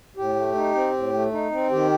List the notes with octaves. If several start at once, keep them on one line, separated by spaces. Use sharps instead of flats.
A2 G4
A3
D#4
C4
A2
A3
D#4
C4
D#3 G4